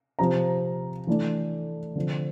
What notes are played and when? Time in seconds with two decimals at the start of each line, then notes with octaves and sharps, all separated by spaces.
0.19 C3 F3 C4 A#5
1.07 E3 A3 D4
1.96 D3 F3 C4